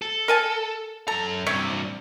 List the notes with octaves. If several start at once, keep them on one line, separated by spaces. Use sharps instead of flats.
A4
A#4 G#5 A5
F#2 A4 A#5
G2 C3 C#5 E5